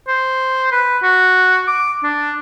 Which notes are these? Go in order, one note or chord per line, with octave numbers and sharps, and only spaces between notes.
C5
B4
F#4
D6
D4